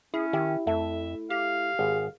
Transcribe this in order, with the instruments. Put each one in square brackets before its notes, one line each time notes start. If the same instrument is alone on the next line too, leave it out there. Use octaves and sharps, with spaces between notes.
[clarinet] C#4 [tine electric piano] E4 [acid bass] G#4
[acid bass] D#3 [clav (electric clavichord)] G4 E5
[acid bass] F2 [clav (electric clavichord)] A3 [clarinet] E5
[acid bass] G4 [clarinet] F5
[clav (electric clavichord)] G#1 [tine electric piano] G#4